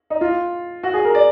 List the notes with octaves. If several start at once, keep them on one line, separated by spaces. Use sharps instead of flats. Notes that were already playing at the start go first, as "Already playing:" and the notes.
D#4
F4
F#4
G#4
A#4
D5